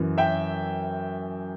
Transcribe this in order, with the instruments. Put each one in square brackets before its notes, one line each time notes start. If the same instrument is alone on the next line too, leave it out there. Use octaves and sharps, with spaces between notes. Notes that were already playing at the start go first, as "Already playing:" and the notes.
Already playing: [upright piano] F#2 E3
E5 G5